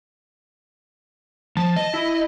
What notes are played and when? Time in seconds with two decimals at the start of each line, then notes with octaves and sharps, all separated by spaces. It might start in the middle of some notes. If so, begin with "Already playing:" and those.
1.57 F3 A5
1.76 D#5
1.94 E4